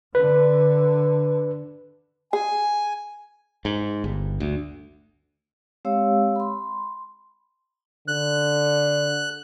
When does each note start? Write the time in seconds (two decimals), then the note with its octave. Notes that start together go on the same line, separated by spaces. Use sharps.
0.15 D3 B4
2.33 G#4 G#5
3.65 G#2
4.04 G1
4.40 D2
5.85 G#3 C4 G4 C#5 F5 E6
6.36 B5 C6
8.08 D3 F#6